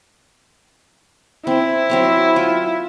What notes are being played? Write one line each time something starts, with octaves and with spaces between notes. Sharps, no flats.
C4 E4
F#3 C4 C#5
F4